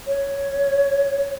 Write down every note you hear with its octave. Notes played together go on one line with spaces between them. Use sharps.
C#5